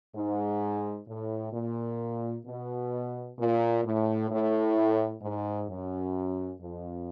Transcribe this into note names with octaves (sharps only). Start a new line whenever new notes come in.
G#2
A2
A#2
B2
A#2
A2
A2
G#2
F#2
F2